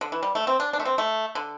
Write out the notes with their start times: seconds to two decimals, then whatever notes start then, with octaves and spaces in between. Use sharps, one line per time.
0.01 D3
0.12 E3
0.23 G3
0.35 A3
0.47 C4
0.60 D4
0.73 D4
0.80 A3
0.85 C4
0.98 A3
1.35 D3